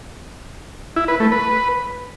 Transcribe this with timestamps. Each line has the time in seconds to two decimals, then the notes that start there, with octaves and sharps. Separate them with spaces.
0.96 E4
1.08 B4
1.20 A3
1.32 B4